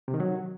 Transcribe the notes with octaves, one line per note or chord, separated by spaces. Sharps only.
C3
D#3
F#3